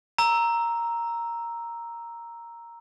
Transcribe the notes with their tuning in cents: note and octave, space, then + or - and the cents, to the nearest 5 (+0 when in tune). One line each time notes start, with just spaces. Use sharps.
A#5 +0 E6 +0